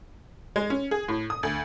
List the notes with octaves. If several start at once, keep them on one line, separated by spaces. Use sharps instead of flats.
G#3
C#4
G#4
A2
D#6
D2